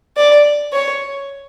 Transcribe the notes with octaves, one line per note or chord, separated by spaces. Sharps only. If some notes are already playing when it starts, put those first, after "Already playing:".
D5
C#5